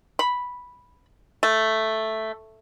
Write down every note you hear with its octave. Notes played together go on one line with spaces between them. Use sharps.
B5
A3